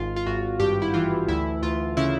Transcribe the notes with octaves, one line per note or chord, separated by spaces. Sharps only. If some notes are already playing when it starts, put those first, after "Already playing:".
Already playing: G#1 F4
F4
G#1 F#4
G2 G4
E4
E3 F4
D2 E4
D2 F4
C#3 E4